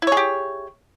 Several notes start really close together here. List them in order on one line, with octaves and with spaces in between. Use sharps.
E4 C#5 G#4 G4